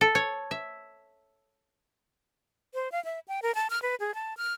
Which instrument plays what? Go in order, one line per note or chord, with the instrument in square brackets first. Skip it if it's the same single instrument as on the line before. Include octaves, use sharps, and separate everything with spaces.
[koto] A4
C#5
E5
[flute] C5
F5
E5
G5
A#4
A5
F6
B4
G#4
A5
F6